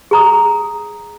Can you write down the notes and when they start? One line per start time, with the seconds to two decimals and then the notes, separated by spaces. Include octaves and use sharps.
0.11 G#4 A#5 D#6